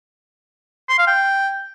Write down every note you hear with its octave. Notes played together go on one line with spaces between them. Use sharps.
C6
F5
G5